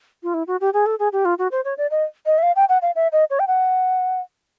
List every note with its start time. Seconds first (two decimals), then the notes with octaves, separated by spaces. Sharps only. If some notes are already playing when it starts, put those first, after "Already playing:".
0.23 F4
0.34 E4
0.47 F#4
0.61 G4
0.74 G#4
0.86 A4
0.99 G#4
1.13 G4
1.25 F4
1.39 F#4
1.52 C5
1.65 C#5
1.78 D5
1.91 D#5
2.26 D#5
2.38 E5
2.43 F5
2.56 G5
2.69 F#5
2.82 F5
2.96 E5
3.12 D#5
3.30 C#5
3.40 G5
3.47 F#5